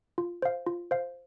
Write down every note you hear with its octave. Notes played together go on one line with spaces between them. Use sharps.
F4
C5 F5
F4
C5 F5